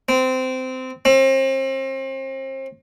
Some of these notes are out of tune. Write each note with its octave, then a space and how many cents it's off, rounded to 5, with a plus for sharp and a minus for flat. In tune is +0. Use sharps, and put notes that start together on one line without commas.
C4 -20
C4 +35